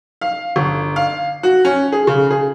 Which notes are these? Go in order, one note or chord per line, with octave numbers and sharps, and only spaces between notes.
F5
G1
F5
F#4
C#4
G#4
C#3
G#4